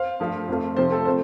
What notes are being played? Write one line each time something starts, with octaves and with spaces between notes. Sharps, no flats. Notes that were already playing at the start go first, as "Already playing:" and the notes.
Already playing: C5 F5
G2 F3 A3
F2 F3 A3
C3 F3 A3 C5
A4
C3 A3 C5